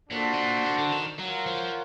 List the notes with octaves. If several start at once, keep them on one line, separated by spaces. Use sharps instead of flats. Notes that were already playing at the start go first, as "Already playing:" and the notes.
A#2 D4 F#4 A4 C5
B2
A#2
D3
D3
D#3
F#3 F4 A#4 C#5 F#5
F3